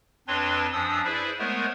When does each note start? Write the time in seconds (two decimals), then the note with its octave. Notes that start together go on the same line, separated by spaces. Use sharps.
0.28 F2 C4 D4 B4 C#5 C6
0.73 F#2 F3 D4 D#6 E6
1.04 E4 G#4 B4 C5 D5 E5
1.39 G#3 A3 B3 A#4 C5 C#5